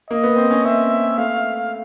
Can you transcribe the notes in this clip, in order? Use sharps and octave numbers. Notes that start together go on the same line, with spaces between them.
A#3 D#5
B3
C4
C#4
C4 E5
A3 F5